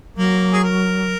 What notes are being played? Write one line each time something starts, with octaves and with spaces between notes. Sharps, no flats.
F#3 A#3
G#4
A#4